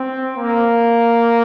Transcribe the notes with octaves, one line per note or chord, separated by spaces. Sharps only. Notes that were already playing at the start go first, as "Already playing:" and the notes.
Already playing: C4
A#3